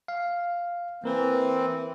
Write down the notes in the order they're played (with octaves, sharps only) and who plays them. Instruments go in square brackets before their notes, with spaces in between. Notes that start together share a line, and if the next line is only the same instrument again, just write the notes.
[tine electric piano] F5
[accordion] E3 C4 [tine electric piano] A#3 A#4 B4